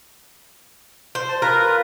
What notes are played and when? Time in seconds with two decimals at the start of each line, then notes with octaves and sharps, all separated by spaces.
1.15 C5
1.28 A5
1.42 F4 A#4 B4